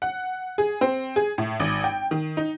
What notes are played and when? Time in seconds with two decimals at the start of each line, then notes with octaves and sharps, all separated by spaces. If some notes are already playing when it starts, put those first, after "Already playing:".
0.02 F#5
0.58 G#4
0.81 C4
1.16 G#4
1.38 A2
1.60 G#1
1.84 G5
2.11 D#3
2.37 D#4